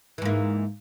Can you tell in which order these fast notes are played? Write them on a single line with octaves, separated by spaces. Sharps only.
E3 G#2 A#3